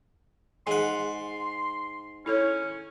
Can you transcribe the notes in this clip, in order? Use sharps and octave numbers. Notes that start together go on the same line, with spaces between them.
G#2 F#5 G#5 C6
C#4 E4 A4 C#5